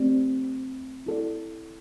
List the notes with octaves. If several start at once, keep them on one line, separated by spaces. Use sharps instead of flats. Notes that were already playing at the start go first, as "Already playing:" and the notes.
Already playing: A3 C4 G4 D5
E4 A4 D5